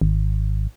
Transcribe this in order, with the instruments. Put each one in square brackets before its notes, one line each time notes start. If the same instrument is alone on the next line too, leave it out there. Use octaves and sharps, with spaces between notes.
[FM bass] G#1